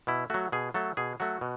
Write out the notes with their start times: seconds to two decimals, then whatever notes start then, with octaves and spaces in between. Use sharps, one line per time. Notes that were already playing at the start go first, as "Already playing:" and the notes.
0.07 B2 E4
0.30 F#3 A3 F#4
0.52 B2 G#4
0.74 F#3 A3 A4
0.97 B2 G#4
1.20 F#3 A3 F#4
1.41 B2